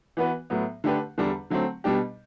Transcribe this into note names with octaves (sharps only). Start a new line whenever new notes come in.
E3 B3 F#4 B4
A2 F#3 B3
D3 A3 D4 G4 B4
E2 D3 G3 D4
D3 F#3 A3 C4
B2 G3 D4 G4